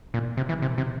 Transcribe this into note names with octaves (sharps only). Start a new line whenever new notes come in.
A#2
C3
E3
C3
C3